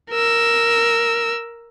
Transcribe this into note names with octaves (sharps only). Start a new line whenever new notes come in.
A#4 E6